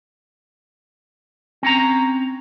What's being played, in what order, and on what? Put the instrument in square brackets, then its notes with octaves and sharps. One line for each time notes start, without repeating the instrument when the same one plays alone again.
[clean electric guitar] C4 C#4 A#5